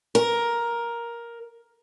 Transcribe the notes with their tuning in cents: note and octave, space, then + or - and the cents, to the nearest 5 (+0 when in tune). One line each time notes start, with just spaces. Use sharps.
A#4 +10